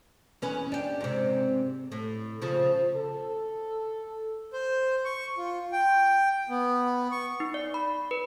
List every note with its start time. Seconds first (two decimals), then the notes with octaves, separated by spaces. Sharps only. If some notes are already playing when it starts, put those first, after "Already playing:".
0.42 E2 C#4 B4
0.72 D4 G4
1.01 G#2 C3
1.92 A2
2.42 C#3 F3
2.96 A4
4.53 C5
5.05 C#6
5.38 F4
5.72 G5
6.49 B3
7.11 C#6
7.40 D#4
7.54 D5
7.74 B5
8.11 B4